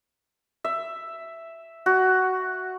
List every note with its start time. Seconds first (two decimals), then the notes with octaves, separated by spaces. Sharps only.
0.64 E5
1.86 F#4